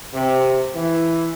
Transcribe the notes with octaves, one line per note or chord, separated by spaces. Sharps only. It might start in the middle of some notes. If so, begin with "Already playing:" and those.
C3
E3